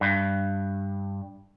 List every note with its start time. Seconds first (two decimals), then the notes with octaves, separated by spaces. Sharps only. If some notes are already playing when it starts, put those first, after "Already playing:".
0.01 G2